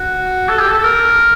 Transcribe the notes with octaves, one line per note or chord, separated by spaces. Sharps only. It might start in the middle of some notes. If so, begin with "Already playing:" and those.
Already playing: F#4
A4
G4
A4
A4
A#4